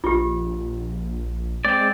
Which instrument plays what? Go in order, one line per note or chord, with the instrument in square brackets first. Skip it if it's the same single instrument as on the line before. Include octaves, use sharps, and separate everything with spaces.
[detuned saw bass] A#1 [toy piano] F4 G4
[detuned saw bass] G#3 [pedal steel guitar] C4 D5